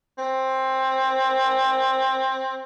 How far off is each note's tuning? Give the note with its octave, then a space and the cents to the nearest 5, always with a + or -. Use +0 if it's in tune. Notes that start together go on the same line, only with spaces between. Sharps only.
C4 +15